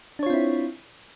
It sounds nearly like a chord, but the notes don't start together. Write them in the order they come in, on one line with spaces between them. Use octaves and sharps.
D4 C#5 F4 C4 E4